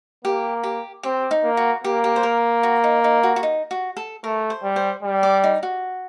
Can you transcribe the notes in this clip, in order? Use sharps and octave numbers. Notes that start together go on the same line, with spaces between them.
A#3 G4
G4
C4 G4
D#4
A#3
F#4
A#3 G4
G4
C5
A#4
F#4
D#4
D#4
F#4
F#4
D#4
F#4
A4
A3 A#4
C5
G3
C5
G3
D5
D#4
F#4